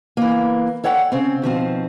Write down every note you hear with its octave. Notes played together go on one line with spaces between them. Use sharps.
E3 A#3
A4 C#5 D5 F#5 G5
C#3 C4
B2 D#3 F3 C4